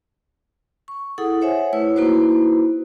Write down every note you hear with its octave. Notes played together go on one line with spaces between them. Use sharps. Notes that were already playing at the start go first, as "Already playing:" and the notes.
C#6
E4 G#4 A4 F#5 D#6
C5 C#5 E5 F#5 G#5
A3 E4 B4 C#5 E6
A#3 D#4 E4 F#4 B4 C5